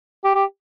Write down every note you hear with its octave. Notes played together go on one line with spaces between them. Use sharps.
G4
G4